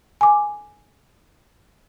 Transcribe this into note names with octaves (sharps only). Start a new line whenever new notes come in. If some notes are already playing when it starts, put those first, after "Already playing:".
G#5 D6